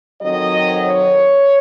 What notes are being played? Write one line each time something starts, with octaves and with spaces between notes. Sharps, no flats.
F2 D#3 F#3 C4 D#5
C#5